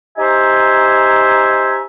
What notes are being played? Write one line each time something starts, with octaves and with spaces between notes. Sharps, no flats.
D#4 G4 C5 E5 G#5 A#5